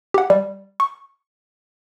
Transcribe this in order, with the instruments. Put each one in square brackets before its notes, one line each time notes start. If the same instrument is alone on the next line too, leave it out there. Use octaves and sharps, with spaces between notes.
[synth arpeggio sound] G4 F#5
G3
C#6